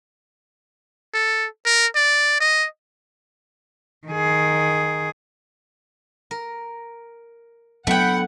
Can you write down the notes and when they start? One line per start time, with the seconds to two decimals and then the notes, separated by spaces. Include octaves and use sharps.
1.14 A4
1.66 A#4
1.95 D5
2.40 D#5
4.08 D#3 G#4
6.31 A#4
7.87 F#3 A3 B3 D4 E4 F#5 G5